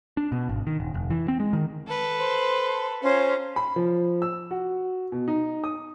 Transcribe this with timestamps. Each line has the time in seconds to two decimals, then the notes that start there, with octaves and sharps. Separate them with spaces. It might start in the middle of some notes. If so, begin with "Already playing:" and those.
0.17 D4
0.32 B2
0.49 G#1
0.67 D#3
0.80 D#1
0.94 F1
1.10 E3
1.28 C4
1.40 G#3
1.53 D#3
1.87 A4 B4
2.18 C5 C6
3.03 C#4 F4 C5 C#5 A#5
3.56 B5
3.76 F3
4.22 E6
4.51 F#4
5.12 B2
5.28 D#4
5.64 D#6